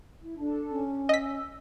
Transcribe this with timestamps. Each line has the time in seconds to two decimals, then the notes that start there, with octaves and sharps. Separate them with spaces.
0.22 E4
0.39 D4 A4 A5
0.71 C#4
1.09 D#5 E6 B6